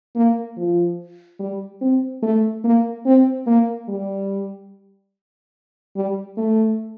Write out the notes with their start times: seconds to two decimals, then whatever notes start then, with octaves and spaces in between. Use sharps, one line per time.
0.15 A#3
0.57 F3
1.39 G3
1.81 C4
2.22 A3
2.64 A#3
3.05 C4
3.47 A#3
3.88 G3
5.96 G3
6.37 A3